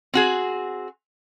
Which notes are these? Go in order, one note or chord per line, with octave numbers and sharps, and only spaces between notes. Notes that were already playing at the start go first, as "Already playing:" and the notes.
C4 F#4 G#4